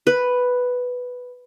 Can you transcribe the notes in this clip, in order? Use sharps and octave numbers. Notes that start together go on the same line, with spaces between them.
B4